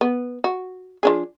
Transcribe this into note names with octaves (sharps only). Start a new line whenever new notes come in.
B3
F#4
F3 D4 G#4